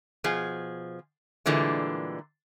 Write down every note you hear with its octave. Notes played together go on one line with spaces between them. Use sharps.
B2 F3 G#4
A#2 D3 E3 G3 G#3